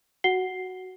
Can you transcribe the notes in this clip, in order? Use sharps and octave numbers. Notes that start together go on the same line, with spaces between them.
F#4 F#5 C7 G7